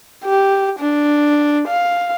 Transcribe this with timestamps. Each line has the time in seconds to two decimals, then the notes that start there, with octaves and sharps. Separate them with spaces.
0.24 G4
0.79 D4
1.68 F5